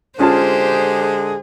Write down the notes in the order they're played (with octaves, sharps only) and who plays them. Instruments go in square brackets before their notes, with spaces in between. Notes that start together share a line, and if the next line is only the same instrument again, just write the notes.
[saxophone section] D3 G#3 G#4 [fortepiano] C#4 F4 A5 [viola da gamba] G4 C5